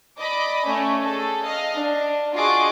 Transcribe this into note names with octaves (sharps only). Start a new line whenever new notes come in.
D5 D#5 B5 D6
A3 C#4 C#5
G#4 A4
D#5 F5 F6
D4
F4 F#4 G#4 D#5 C#6 D6